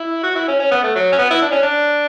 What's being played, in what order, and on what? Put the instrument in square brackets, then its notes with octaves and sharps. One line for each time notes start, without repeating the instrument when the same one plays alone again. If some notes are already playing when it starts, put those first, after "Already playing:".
Already playing: [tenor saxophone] E4
F#4
E4
C#4
C#4
B3
A3
F#3
C#4
B3
E4
D4
C#4
D4